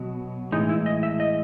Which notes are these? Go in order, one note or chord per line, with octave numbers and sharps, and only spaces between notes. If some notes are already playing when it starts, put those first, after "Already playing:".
Already playing: B2 F#3
A2 E3 G#3 D#4
E4
D#5
E5
D#5